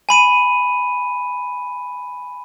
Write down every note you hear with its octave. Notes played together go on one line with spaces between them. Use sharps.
G#5 B5 D#7